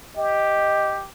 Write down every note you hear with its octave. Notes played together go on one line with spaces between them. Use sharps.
G4 D#5